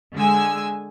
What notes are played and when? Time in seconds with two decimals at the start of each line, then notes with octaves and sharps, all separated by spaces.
0.16 D3 G#3 G#5 E6